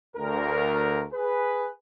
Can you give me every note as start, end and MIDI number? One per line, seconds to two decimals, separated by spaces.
0.16 1.04 38
0.16 1.04 70
1.13 1.69 68
1.13 1.69 71